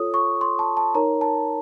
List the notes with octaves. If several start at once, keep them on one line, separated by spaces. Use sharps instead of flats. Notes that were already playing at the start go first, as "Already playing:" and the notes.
Already playing: F4 A4 C#5 D#6
C#6
C6
A5
A5
D#4 A#4 C#5 A#5
A5